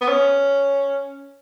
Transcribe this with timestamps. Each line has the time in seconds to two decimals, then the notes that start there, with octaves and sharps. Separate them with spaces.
0.01 B3
0.09 C#4